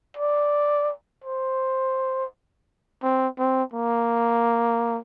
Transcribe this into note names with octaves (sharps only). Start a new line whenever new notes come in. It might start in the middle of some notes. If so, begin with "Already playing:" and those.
D5
C5
C4
C4
A#3